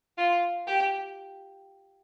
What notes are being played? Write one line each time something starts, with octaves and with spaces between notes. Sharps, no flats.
F4
G4